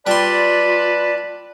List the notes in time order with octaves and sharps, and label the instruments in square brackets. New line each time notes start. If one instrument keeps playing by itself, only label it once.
[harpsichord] G3 C6 [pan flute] F4 [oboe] B4 [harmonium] D5 A5